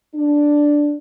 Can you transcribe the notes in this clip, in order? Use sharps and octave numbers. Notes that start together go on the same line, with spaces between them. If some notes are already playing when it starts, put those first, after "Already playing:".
D4